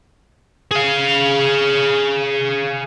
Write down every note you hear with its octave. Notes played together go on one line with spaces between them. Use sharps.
G#4 F5